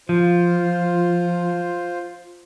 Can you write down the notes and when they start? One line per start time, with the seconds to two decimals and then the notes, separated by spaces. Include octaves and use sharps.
0.09 F3 F4 C5